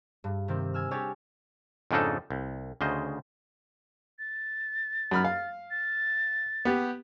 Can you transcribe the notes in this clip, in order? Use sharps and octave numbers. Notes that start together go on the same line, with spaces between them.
G2
C3 D#3 C4
G#5 E6 F6
D4 G4 C#5 G#5
F2 G#2 C#3 D4 D#4 A4
C2
D2 C#3 C5 D#5
A6
F#2 B5 F6
F5
A6
B3 G4